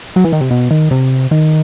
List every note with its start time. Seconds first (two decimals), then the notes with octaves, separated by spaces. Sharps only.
0.16 F#3
0.24 E3
0.33 D#3
0.41 C3
0.51 B2
0.71 D#3
0.91 C3
1.31 D#3